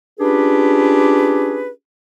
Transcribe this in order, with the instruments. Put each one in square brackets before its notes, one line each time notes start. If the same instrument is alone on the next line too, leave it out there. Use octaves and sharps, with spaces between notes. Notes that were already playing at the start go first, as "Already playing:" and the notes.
[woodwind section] C#4 D4 F4 G4 G#4 B4